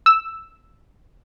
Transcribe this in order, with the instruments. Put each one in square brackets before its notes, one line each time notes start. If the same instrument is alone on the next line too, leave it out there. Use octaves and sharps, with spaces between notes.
[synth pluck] E6